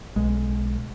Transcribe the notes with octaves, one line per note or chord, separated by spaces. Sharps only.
B1 G#3